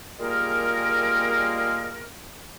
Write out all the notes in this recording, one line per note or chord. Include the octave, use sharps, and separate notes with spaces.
G3 G#3 A#3 F4 G#4 A#4